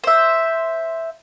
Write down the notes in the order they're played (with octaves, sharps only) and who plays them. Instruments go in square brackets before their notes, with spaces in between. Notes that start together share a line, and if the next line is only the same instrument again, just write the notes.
[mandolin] C5 E5